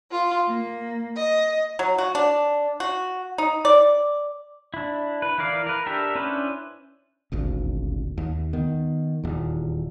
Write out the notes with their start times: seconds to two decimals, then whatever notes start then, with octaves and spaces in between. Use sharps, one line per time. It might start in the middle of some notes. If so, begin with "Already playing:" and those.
0.12 F4
0.46 A#3
1.16 D#5
1.79 F#3
1.98 F#4
2.15 D4
2.80 F#4
3.38 D#4
3.65 D5
4.74 D4 E4
5.22 B4
5.38 E3 E4 A#4 D5 F5
5.67 A#4 B4
5.86 D4 G4 A4 A#4 E5
6.15 C#4 D4 E4 B4 C5
7.32 D#1 G#1 D2
8.18 D#2
8.53 D#3 B3
9.24 D#1 E2